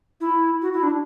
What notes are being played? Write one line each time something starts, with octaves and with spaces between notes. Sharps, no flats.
E4
F#4
E4
D4